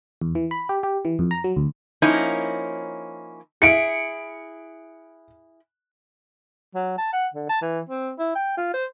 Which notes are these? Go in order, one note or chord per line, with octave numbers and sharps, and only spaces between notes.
E2
E3
B5
G4
G4
E3
F2
A#5
F#3
D2
F3 A#3 C#4 D#4 E4
E4 G#4 C#7 D7
F#3
A5
F#5
D3
A5
E3
C4
E4
G5
F4
C5